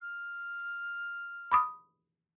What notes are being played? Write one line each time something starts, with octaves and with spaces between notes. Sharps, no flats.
F6
B5 D6 D#6